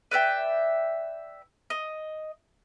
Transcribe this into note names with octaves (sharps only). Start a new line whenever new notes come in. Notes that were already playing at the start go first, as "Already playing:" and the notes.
B4 D5 E5 G5
D#5